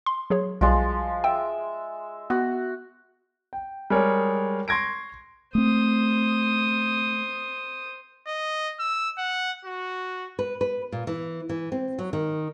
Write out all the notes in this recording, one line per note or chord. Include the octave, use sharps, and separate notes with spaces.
C6
F#3 G#4 C#5
B1 F3 G3 G#3
E5 G5
B3 F#4
G5
G3 G#3 G#4 A#4 C#5
C6 C#6 G#6 A#6 D7
A3 C4 C5 D#6
D#5
E6
F#5
F#4
B4
B4
A#2
E3
E3
C4
F#3
D#3